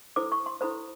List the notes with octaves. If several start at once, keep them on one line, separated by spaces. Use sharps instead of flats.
E4 A4 C5 D6
C#6
C6
E4 A4 C5 B5